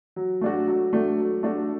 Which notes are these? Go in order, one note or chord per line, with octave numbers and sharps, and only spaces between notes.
F#3
A3 D4 F#4
F#3
A3 D4 F#4
F#3
A3 D4 F#4